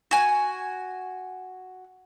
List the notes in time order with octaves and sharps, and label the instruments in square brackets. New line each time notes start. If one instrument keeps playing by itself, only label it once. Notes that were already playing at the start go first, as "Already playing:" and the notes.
[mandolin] F#4 G#5